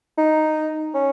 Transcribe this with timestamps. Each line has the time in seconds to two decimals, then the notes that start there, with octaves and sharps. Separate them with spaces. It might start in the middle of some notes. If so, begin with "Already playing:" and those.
0.18 D#4
0.94 C#4